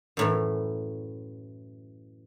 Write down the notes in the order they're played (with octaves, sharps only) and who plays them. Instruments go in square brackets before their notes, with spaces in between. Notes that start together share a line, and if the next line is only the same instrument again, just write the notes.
[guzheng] F#2 A2 E3